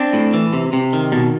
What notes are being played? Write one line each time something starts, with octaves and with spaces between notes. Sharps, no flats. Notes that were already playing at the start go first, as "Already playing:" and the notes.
Already playing: C4 D4
A2
E3
C3
C3
D#3
B2